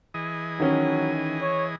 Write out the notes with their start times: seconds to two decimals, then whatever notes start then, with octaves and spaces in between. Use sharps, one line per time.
0.14 E3 G#4 D#5
0.60 D#3 F#3 C#4
1.41 C#5